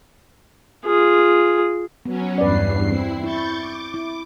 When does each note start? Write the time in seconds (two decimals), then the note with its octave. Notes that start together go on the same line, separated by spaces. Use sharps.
0.86 F4 G#4
2.05 F#3 B3 C#4
2.38 E2 G2 B4 D5 C7
2.90 C4 E4
3.24 E4 C#6 G6 A6
3.58 D6
3.94 E4